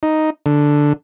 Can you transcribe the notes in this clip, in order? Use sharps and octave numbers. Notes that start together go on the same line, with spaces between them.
D#4
D3